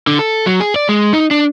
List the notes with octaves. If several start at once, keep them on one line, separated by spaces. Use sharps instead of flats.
D3
A4
F#3
G#4
D5
G#3
D#4
D4